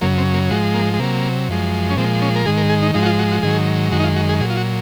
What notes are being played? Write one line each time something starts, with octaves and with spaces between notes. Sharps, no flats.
F#2 C#3 F#3 A#3
C4
A#3
G#2 F3 G#3 F#4
A#3
G#3
C3 F#3 A#3
F#2 F3 G#3
C#4
A#2 F3 G#3 C4
C#4
A#4
G#2 D#3 G#3 G#4
A#4
G#4
D#4
G#2 F3 G#3 D#4
F#4
F4
F#4
F#4
G#2 D#3 F#3 G#4
F#2 D#3 G#3 F#4
D#4
F4
F#4
G#4
A#2 F#3 G#4
F4
F#4